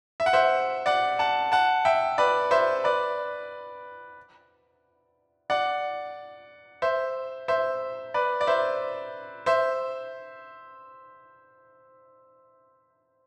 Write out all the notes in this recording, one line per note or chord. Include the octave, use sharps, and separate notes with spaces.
E5
F#5
C5 E5
D5 F#5
F#5 A5
F#5 A5
E5 G5
B4 D5
C5 E5
B4 D5
D5 F#5
C5 E5
C5 E5
B4 D5
D5
C5 E5
C5 E5